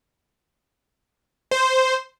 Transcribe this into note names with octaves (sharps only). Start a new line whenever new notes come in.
C5